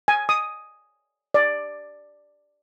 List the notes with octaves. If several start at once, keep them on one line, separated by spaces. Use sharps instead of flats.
G#5
D#6
D5